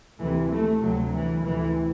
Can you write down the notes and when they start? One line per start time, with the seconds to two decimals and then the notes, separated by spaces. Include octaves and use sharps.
0.19 D2 C3 E3
0.51 A3
0.82 D2 C3 F#3
1.13 E3
1.44 D2 C3 E3